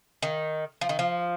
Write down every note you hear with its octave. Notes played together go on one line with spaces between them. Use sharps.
D#3
F3
D#3
F3